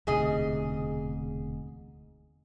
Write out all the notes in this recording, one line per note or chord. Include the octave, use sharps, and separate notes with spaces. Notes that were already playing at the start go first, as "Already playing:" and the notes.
E1 D2 G#2 C3 G#4 D#5